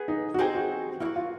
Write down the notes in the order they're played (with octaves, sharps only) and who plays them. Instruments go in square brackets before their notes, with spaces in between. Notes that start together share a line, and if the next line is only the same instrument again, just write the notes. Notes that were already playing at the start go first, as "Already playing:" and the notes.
Already playing: [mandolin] B3 G#4
[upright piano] D#4
F#4
[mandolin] C4 D#4 G#4 C5 [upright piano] G4
[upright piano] F#4
[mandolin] A#3 D#4 [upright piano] E4
[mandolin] F#4
[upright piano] F4